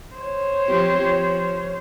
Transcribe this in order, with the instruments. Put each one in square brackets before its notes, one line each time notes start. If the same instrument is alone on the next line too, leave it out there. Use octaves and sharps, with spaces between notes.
[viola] C5 C#5
[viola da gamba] F3 C4 G4
F3